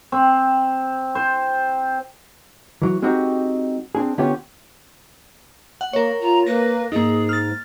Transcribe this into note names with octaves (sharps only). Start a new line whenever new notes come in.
C4
C5
E3 F#3
G#3 C4 D#4 F#4 G4
C4 D4 G#4
D3 B3 C#4 F4 G4
F#5
A#3 A#4 C#5
F4 A#5
A#3 B4 A#6
G#2 A#3 D#4 G#4
F6 A6